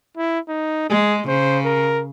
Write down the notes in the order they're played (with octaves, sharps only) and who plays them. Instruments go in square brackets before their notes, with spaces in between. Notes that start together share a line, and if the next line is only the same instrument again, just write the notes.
[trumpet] E4
D#4
[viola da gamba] G#3 [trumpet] G#4
[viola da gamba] C#3 [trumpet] C5
[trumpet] A#4